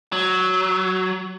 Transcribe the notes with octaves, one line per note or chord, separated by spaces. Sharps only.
F#3